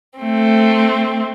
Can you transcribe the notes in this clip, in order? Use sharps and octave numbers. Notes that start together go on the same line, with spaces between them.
A3 C4